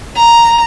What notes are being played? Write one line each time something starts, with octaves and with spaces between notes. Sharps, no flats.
A#5